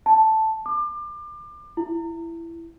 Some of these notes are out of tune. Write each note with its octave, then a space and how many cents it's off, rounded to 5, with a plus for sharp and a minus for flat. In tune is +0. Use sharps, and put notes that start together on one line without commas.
A5 +0
D6 +30
E4 +15